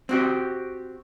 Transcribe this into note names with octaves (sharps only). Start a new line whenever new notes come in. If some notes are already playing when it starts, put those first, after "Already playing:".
C4 F#4 G4